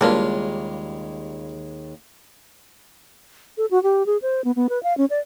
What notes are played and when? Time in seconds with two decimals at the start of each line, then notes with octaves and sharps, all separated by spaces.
0.01 D#2 C#3 E3 G3 G#3 A#3 D4 F4
3.58 A4
3.71 F#4
3.83 G4
4.06 G#4
4.22 C5
4.45 B3
4.56 B3
4.69 B4
4.83 F5
4.98 C#4
5.10 D5